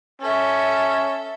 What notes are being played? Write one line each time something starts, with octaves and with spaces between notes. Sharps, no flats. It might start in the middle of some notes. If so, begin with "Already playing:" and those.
C#4 A4 E5